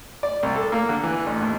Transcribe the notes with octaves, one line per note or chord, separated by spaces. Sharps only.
D5
C2
A4
A#3
D3
E3
A1
D#2